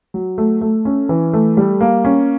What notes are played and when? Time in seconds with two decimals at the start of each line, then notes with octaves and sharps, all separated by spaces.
0.14 F#3
0.38 A3
0.61 A3
0.85 C#4
1.09 E3
1.33 A3
1.57 G3
1.81 A#3
2.05 C#4